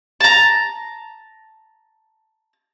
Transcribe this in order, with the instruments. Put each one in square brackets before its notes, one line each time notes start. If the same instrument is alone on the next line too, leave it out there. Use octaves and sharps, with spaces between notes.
[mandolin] A5 A#5